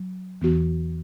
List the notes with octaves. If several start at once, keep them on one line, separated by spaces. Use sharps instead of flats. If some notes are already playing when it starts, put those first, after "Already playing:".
Already playing: F#3
E2 E3 B3 F#4